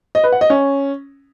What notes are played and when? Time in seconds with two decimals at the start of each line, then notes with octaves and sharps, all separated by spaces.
0.15 D#5
0.24 B4
0.32 F#5
0.41 D#5
0.50 C#4